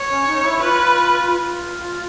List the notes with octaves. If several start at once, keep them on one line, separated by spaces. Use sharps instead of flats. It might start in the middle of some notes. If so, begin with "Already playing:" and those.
Already playing: C#5
C#4
D#4
E4
F4 B4
F4